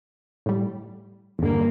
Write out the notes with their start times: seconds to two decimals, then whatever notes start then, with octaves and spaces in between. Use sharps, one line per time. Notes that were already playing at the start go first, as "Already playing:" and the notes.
0.46 A2 G3
1.39 E2 G2 D3 A#3